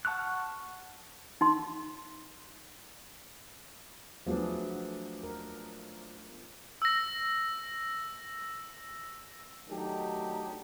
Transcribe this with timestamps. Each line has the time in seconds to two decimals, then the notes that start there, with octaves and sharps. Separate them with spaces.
0.05 F#5 A5 C#6 F6 F#6
1.41 D#4 C6
4.26 F3 F#3 A3 B3 D4 G#4
5.23 A#4
6.82 E6 A#6
9.68 D#3 F#3 A3 D4 D#4 G4